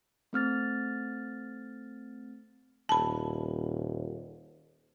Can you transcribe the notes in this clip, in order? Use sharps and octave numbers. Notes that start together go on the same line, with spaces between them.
A3 C4 F6 A6
D#1 A5 B5